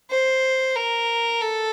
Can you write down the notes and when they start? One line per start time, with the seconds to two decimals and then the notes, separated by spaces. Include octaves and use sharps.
0.10 C5
0.75 A#4
1.41 A4